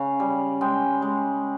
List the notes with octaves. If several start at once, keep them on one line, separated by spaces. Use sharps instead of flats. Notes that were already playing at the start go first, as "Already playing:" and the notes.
Already playing: C#3 F5
G3
G#3 G5
G#3